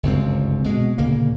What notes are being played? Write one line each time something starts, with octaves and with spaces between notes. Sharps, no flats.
G1 C#2 F#2 C4
B2 G#3
D2 A#2 C#3 A#3